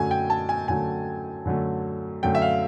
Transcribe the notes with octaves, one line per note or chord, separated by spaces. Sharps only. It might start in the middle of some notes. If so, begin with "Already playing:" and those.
Already playing: F#2 D3 F#3 A3 G#5
G5
A5
G#5
F#2 D3 F#3 A3 G#5
F#2 D3 F#3 A3
F#2 D3 F#3 A3 G5
E5
F5